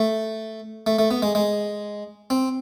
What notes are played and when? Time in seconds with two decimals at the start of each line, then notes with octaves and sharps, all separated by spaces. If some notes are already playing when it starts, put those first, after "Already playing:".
Already playing: A3
0.86 A3
0.99 A3
1.11 B3
1.22 G#3
1.35 G#3
2.30 C4